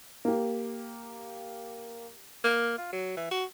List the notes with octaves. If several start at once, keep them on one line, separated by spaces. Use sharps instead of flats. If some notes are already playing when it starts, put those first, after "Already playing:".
A#3 G4
A#3
F4
F#3
E3
F#4